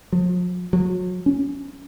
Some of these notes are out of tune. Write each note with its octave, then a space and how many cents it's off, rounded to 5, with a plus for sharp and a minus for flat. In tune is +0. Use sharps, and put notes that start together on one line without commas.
F3 +45
F#3 -30
C#4 +10